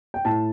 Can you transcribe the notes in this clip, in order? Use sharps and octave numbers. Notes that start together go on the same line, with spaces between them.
G5
A2 A5